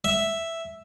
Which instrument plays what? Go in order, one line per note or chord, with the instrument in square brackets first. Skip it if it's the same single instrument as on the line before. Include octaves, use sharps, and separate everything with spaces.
[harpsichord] E5